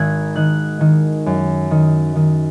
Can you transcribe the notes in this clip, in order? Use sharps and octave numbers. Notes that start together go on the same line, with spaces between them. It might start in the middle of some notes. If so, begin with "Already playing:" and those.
Already playing: G#1 D#3 E6 F#6 G#6
D#3 F#6
D#3
F#2
D#3
D#3